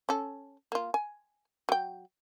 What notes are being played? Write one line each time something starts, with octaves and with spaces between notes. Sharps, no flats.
C#4 A4
A#3 F4
G#5
F#3 G5